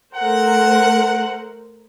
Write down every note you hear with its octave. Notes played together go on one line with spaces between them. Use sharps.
A3 A#4 C5 F#5